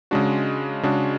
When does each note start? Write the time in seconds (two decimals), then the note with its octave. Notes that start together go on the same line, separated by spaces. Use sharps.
0.11 C#3 G#3 D4 F#4
0.83 C#3 G#3 D4 F#4